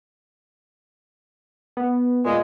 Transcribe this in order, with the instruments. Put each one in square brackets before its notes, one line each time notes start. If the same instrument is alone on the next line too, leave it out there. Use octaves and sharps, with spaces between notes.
[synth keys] B3
[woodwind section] A#2 G#3